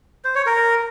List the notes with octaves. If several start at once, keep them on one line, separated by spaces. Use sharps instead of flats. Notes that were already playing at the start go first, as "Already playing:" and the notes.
C5
C#5
A#4